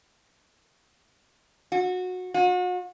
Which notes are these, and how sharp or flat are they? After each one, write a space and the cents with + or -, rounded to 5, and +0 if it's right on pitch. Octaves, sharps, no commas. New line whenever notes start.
F#4 -20
F#4 -40